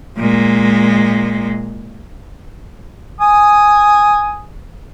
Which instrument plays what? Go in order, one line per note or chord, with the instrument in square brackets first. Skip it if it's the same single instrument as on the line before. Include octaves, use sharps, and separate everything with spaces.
[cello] A#2 G#3
[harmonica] G#5 D#6